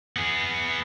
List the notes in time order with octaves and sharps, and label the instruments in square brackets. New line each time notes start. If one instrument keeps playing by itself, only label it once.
[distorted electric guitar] B3 G#4